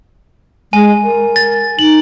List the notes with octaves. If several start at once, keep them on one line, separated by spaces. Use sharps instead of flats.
G#3 G#5
A#4
A6
D#4 F#7